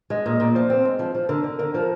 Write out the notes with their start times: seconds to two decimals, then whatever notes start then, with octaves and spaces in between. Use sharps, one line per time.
0.10 G#3 D#5
0.26 A#2 D#5
0.40 A#2 D5
0.55 F3 C5
0.70 C4
0.85 G#3
0.99 F3
1.15 F3
1.29 D3 A#4
1.44 D3
1.59 D3 A#4
1.74 F3
1.79 A#4